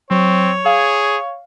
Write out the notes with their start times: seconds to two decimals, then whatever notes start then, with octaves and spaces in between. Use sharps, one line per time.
0.11 F#3 C4 C#5
0.66 G#4 F5